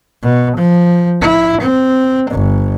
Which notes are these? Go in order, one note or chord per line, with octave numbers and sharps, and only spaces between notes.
B2
F3
E4
C4
G1